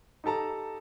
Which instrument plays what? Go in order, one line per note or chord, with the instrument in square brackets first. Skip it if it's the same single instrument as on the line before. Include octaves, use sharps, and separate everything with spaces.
[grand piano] D#4 G4 A4 A5 A#5